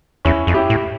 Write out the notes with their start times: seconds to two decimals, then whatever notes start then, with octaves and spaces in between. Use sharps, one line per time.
0.25 E2 C#4 E4
0.47 F2
0.54 E4 G4
0.70 A2